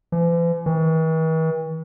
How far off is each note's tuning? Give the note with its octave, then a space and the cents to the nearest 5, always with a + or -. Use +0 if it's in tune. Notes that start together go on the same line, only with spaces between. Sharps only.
E3 +45
E3 -45